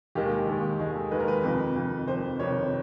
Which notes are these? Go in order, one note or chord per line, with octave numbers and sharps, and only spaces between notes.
D#2 D#3 G#3 G4
D#2 D#3 G#3
D#2 D#3 G#3 G#4
A4
D#2 D#3 G#3 B4
A#4
B4
F2 C3 D#3
F2 C3 D#3
F2 C3 D#3 C5
F2 C3 D#3 C#5